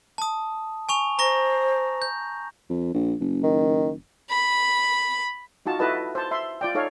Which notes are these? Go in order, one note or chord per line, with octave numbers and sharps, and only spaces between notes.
A5 D#6
G#5 C#6 F7
C5 A#5 C#6 A#6
G6
F2
A#1
F#1
D#3
B5
D#4 F4 F#4 A5
E4 F#4 A4 B4 D#5 A5
C5 A5
E5 C6
F4 D5 G5
D#4 A4 C#5 F5